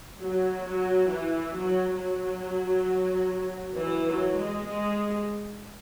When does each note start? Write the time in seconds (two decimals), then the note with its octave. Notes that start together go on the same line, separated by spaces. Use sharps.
0.22 F#3
0.67 F#3
1.11 E3
1.56 F#3
2.00 F#3
3.78 E3
4.08 F#3
4.38 G#3
4.67 G#3